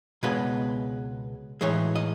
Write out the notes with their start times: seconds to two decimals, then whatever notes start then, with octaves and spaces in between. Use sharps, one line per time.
0.23 C#2 B2 G#3 B3 B4
1.61 A2 E3 G#3 C#5
1.95 D#5